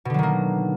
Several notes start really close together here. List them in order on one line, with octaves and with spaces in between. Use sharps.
B2 D3 F#3 D#3 A#3